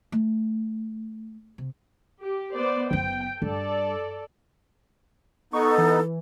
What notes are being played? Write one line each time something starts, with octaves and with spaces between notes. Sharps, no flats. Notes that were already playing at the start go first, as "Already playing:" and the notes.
A3
C3
G4
B3 C5 D5
F#1 B3 G5
G2 A4 D5
B3 D#4 A4 C#6
E3